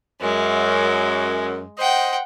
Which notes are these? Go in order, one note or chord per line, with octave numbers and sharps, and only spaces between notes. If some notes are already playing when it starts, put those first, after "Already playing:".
F#2 G#3
C5 D#5 F#5 G5